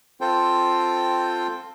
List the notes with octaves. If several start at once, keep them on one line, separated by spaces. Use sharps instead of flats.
C4 F4 A4 C5 G5